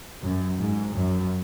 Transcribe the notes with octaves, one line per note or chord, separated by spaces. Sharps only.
F#2
G#2
F#2